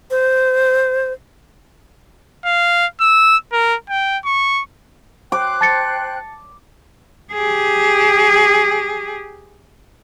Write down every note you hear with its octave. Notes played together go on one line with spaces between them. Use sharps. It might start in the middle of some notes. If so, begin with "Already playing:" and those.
C5
F5
E6
A#4
G5
C#6
C5 G5 D6 F#6
A5 A6 C#7
G4 G#4